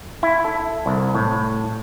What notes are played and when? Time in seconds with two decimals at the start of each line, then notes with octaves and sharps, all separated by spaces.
0.23 E4
0.44 A4
0.86 C2
1.15 A2